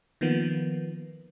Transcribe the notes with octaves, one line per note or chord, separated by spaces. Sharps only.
D#3 F3 A#3 B3